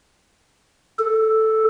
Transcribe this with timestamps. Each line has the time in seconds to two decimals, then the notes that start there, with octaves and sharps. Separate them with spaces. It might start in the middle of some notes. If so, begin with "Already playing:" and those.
0.99 A4